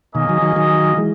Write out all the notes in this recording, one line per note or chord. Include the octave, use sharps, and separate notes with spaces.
B2 D#3 A#3 C#4 G#4 D#5
D#3 F#3
D#3 F#3
D#3 F#3
E3 G#3